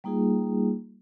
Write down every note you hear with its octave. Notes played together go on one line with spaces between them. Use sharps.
G3 A#3 D#4 F4 G#4